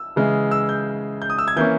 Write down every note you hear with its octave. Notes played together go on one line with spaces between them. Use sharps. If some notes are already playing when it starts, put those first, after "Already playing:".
Already playing: E6
C#3 E3 G#3
E6
G6
G6
D#6
E6
G#6
E3 A#3 C#4 G6